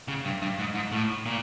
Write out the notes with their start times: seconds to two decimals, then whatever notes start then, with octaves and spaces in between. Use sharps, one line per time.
0.08 C#3
0.25 G2
0.42 G2
0.59 G#2
0.75 G#2
0.92 A2
1.26 A#2